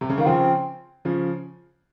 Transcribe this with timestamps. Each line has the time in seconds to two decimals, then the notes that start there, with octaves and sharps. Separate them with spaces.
0.01 C3
0.09 C#3
0.18 D#3 A#3
0.26 C#3 F3 C4
1.05 C#3 F3